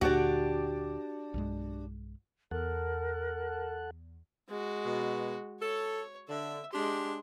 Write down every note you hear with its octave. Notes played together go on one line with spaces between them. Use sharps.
D2 A#2 D3 D4 F#4 G4 D5
B1 G2 G#3
E2 A4 A#4 F#5
G#3 F#4
B2
A4 C#5
D3 E5
G#3 D4 G4 C6